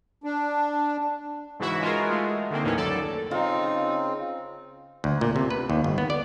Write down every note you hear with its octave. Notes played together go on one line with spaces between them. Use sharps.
D4
G#2 C#3 E3 E4 F#4 E5
G#3 F4 F#4 G#4 A#4
G#3 A3
D3 D#3 A#3 C4
D#2 A2 D#3 E3 F#3 C#4
C#2 F#2 A4 D5
C#3 C4 D#4 F4
D2
A#2
C3
B4
D#2
G1
B3
D5